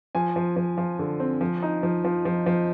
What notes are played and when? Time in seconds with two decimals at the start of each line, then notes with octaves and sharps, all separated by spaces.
0.15 F3 G#5
0.36 F3
0.56 F3
0.78 F3
0.99 D3
1.20 C4
1.41 F3
1.63 D#4
1.83 F3
2.05 F3
2.25 F3
2.46 F3